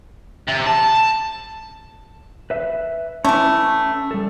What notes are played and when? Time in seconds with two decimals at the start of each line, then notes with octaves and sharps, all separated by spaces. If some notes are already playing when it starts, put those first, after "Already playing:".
0.48 C3
0.66 A5
2.50 B4 E5
3.25 E3 A3 C#4
4.11 G3 A4